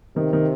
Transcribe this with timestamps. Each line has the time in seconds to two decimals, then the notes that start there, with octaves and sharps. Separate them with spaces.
0.16 C3 D#3
0.33 D#3